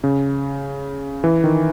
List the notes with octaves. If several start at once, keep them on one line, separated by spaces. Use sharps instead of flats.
C#3
E3
D#3